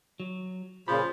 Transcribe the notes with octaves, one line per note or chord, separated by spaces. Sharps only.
F#3
A#2 C#3 F3 B5